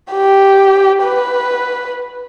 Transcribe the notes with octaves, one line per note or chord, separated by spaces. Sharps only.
G4
B4